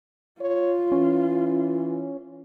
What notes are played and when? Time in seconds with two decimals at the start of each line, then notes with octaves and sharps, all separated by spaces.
0.41 F4 C#5
0.92 E3 C#4